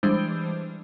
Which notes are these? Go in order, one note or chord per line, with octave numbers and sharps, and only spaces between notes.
E3 G3 G#3 D4 C5